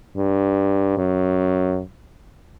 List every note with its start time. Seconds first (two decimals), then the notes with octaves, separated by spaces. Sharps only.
0.17 G2
0.97 F#2